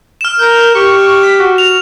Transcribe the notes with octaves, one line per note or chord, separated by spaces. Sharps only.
F6 E7
A#4 G6
G4 C#6
B6
F#4
F7